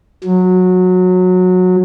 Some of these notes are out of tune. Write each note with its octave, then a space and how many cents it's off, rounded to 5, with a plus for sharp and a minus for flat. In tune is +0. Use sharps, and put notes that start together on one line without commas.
F#3 -20